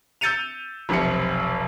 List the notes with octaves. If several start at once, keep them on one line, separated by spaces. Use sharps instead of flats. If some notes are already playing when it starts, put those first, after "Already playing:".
E6 G6 A6 C#7 D#7 F7
F1 B1 C3 C4 C#7